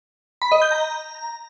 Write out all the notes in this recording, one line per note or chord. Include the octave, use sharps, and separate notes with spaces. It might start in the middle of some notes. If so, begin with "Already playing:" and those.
B5
D#5
G6
A#5